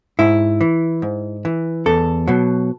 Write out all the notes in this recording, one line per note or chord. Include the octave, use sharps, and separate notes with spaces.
G#2 E4
E3
G#2
E3
E2 A4
B2 F#3